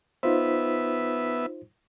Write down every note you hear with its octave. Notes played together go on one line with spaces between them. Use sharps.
B3 D#4 F4 C5 E5